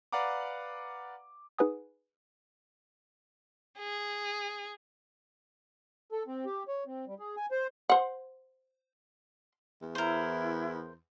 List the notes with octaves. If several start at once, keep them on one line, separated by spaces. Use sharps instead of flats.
B4 D5 F5 F#5 A#5 D6
D#4 G#4 B4 F#5 G#5 D#6
G#4
A4
C4
G4
C#5
C4
G3
G#4
G#5
C5
C5 F#5
E2
E4 A#4 C5